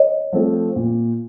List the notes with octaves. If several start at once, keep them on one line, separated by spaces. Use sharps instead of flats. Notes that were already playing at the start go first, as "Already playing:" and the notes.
Already playing: C#5 D#5
F3 A3 C4 F4
A#2